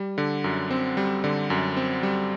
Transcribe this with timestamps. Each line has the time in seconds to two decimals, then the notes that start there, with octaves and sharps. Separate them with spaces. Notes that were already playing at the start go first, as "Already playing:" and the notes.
Already playing: G3
0.18 D3
0.44 F#2
0.71 C4
0.97 G3
1.24 D3
1.50 F#2
1.77 C4
2.03 G3